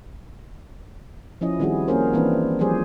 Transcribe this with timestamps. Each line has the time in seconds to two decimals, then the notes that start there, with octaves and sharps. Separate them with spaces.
1.41 F3 C#4 E4 D#5
1.60 D#3 G3 C4 E4 F#4 G#4
1.88 A#3 C4 C#4 G#4 A#4 C5
2.13 E3 A#3 C4 D4 E4 B4
2.59 F3 G3 G4 G#4 C5 C#5